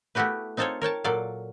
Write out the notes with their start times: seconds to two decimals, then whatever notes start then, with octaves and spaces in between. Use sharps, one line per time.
0.15 A3 B3 E4 F#4 G4 B4
0.57 C4 D#4 F4 A4 C5 C#5
0.82 A#4 C#5 G5 A5
1.04 A#2 F#3 A4 D5 F5